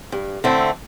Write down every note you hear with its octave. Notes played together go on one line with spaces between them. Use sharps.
G2
D3 A3 C4 E4